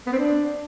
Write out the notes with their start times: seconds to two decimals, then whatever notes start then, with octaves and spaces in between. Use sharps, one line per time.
0.07 B3
0.12 C4
0.18 D4